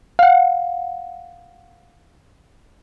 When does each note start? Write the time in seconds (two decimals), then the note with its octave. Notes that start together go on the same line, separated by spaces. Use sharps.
0.19 F5 F#5